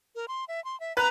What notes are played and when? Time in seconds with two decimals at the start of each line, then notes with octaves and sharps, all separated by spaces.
0.15 A#4
0.28 C6
0.48 E5
0.65 C6
0.80 E5
0.97 B4 A#5 F#6